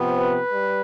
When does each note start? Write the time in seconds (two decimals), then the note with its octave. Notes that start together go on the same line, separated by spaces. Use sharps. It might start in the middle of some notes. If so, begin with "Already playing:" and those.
Already playing: C3 F3 B3
0.20 B4
0.53 G3